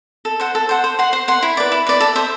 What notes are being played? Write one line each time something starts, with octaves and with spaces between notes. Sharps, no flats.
A4
C5 F#5
A4
C5 F#5
C5
F#5 C6
C5
F#5 C6
E4
B4 D5
E4
B4 D5
A4
C5 E5